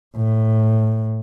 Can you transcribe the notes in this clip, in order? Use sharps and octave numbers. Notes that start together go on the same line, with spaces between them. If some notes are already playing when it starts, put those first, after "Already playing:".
A2